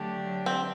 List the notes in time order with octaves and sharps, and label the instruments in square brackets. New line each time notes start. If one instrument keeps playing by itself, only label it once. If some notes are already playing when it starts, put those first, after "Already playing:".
Already playing: [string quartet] D3 F#3 A3 D4 G4
[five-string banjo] C4